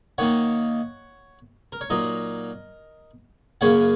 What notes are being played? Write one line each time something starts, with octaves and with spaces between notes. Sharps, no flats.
D#3 A#3 D#4 C#5 F#5
A#4
C#5
A#2 F#3 D#4 A#4 D#5
F#2 C#3 A#3 C#4 C#5 F#5